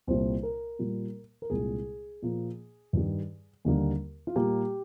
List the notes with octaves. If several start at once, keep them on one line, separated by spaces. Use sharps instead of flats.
C2 A#2 G3 A#3 C5
A#4
A#2 G3 A#3
A#4
C2 A#2 G#3 G#4
A#2 F3 A#3
G2 D#3 G3
D#2 D3 G3 A#3
F4
A#2 G3 A#3 G4